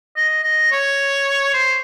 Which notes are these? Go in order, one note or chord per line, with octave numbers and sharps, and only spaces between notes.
D#5
D#5
C#5
C5